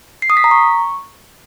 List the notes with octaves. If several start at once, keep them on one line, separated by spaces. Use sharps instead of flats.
C7
D#6
B6
A#5
C#6